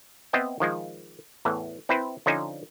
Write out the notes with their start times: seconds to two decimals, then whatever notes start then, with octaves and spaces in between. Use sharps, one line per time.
0.33 B3 C4 D#5 E5 G5
0.60 D#3 F3 G#3
1.45 E2 A2 E3
1.89 C4 E4 B4 C5
2.26 D3 F3 C#4 D#4 C5 G#5